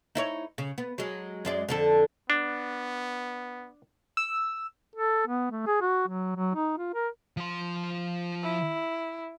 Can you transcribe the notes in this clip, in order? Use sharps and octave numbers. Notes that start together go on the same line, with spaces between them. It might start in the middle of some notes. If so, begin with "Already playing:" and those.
D#4 E4 C#5
C#3
B3
F#3 G#3
F#2 G#3 D5
F2 D3 A4
B3 D4
E6
A4
B3
A3
G#4
F#4
F#3
F#3
D#4
F4
A#4
F3 C6
E4